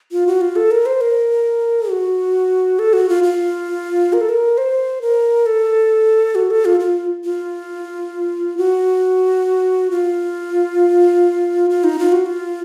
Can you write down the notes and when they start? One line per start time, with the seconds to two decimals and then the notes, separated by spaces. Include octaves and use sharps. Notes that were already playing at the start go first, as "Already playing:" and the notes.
0.12 F4
0.27 F#4
0.41 F4
0.56 A4
0.71 A#4
0.86 C5
1.01 A#4
1.90 F#4
2.79 A4
2.93 F#4
3.09 F4
3.23 F4
4.13 A#4
4.21 A4
4.29 A#4
4.58 C5
5.02 A#4
5.46 A4
6.35 F#4
6.50 A4
6.65 F4
6.80 F4
7.24 F4
8.58 F#4
9.91 F4
11.70 F4
11.84 D#4
11.99 F4
12.12 F#4
12.26 F4